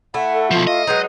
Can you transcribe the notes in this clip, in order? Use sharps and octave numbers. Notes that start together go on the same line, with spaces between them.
A3 E4 F#5
A4
B2 F3 F4
D#5 F5
F#3 G#3 D#4 B4 G6